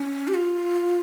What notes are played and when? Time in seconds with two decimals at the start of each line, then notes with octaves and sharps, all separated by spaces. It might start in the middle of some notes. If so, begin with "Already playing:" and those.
Already playing: C#4
0.28 G4
0.34 F4